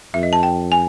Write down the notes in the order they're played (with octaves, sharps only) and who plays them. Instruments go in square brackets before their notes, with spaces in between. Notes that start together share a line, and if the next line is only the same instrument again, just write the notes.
[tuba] F2 [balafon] E5
[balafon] D#5
A5
G5
G#5